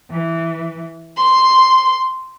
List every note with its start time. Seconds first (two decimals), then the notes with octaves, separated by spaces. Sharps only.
0.10 E3
1.17 C6